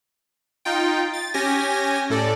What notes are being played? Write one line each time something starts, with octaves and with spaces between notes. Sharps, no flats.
D#4 F4 G5
A6
C#4 G4 G#5 A#6
A2 A4 D5